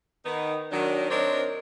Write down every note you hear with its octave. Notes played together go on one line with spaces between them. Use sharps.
D#3 B3 D#4
D#3 F#3 D4
C4 D4 D#4 A#4 C5 C#5